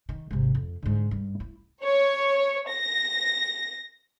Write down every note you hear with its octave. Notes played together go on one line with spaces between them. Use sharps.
D#3
G#1 C3
F2
G#2 D3
G2
E4
C#5
A#6